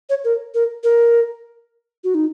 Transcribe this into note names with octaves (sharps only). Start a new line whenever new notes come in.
C#5
A#4
A#4
A#4
F#4
D#4